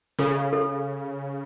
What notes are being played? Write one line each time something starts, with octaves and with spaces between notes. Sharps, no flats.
C#3 A4
F5
A4